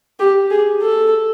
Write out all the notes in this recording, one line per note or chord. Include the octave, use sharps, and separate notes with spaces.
G4
G#4
A4